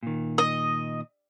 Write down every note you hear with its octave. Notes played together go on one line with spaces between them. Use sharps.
A#2 D#3
D#5